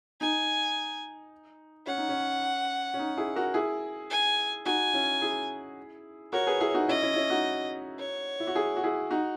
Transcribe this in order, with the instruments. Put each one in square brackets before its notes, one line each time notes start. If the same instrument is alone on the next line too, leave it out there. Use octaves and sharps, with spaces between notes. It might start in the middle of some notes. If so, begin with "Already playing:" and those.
[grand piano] D#4 [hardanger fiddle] G#5
[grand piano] C#4 [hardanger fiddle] F#5
[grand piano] D#4
C#4
C#4
D#4
E4 G#4
F#4 A#4
E4 G#4
[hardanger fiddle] G#5
[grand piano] D#4 F#4 [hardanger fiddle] G#5
[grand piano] C#4 E4
E4 G#4
[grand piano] F#4 A#4 [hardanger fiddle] C#5
[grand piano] G#4 B4
E4 G#4
D#4 F#4
[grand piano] C#4 E4 [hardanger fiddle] D#5
[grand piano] C#4 E4
C#4 E4
D#4 F#4
[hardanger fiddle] C#5
[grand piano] E4
F#4
E4 G#4
F#4
E4 G#4
D#4 F#4